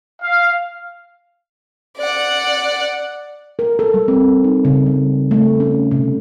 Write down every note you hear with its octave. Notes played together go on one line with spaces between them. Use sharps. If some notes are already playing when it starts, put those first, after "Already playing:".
F5
D5 F#5
A#4
A4
G3
C4
D#4
C#3
G3
A3
C#4
C3